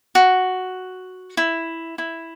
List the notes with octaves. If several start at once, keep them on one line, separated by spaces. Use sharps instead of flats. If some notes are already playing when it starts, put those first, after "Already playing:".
F#4
E4
E4